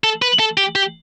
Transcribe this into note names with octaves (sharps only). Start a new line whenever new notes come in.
A4
B4
A4
G4
G4